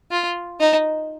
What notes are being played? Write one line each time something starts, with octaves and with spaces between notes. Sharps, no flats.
F4
D#4